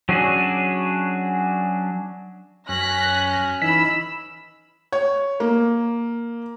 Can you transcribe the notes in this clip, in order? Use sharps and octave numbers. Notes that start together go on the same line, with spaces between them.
F#3 C#4 D4 F#4 G#4
F#2 C#4 F#6 A#6 B6
E3 D#4 B5 E6 B6
C#5
A#3